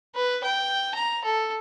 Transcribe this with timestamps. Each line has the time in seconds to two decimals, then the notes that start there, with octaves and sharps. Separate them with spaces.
0.15 B4
0.45 G5
0.95 A#5
1.25 A4